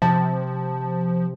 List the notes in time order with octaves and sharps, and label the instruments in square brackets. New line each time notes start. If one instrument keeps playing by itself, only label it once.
[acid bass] C3 [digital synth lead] F3 [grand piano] A5